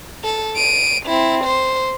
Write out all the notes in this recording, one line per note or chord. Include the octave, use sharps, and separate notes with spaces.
A4
D7 D#7
C4 E4
C5